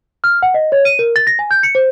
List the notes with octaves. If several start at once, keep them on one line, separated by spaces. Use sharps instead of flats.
F6
F#5
D#5
C#5
D#7
A#4
A6
A#6
G#5
G6
C#7
C5